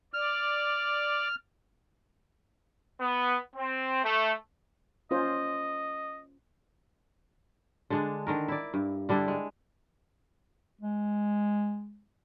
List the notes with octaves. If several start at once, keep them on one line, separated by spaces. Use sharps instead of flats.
D5 F6
B3
C4
A3
C#4 F4 C5 D#5
D3 G#3 D4
D3 D#3 A#4
E4 D5
G2
D3 G3 D4 E4
G#3
G#3